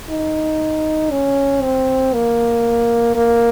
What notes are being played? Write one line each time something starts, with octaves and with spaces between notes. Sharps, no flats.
D#4
C#4
C4
A#3
A#3